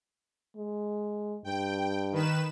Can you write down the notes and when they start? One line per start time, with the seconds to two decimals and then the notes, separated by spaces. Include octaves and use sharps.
0.56 G#3
1.44 G2 G5
2.12 D#3 B4 E7